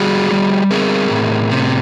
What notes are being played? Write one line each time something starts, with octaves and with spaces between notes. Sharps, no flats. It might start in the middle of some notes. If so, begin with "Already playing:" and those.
Already playing: G3 F#4 G#4
G3
C4 G#4 A#4
A2
C3